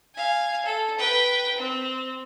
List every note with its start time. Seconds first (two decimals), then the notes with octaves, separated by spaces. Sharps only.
0.15 F5 G#5
0.66 A4
0.98 B4 G5
1.58 C4